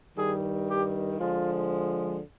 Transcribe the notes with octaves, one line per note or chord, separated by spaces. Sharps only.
G2 D#3 G3 G#4
G4
D3 F3 G#3 F4